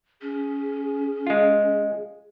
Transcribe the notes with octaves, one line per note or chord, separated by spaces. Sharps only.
C#4 G#4
G#3 F4